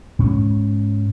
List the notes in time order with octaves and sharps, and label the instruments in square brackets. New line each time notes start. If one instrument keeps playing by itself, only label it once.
[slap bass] G#2 C#4